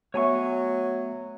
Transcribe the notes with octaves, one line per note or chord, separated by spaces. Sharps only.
F#3 A3 B3 C#5 E5 G#5 C#6